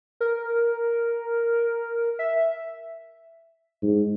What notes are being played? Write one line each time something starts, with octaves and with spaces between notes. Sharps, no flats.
A#4
E5
G#2